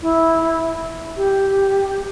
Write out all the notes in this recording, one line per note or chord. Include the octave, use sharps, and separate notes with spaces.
E4
G4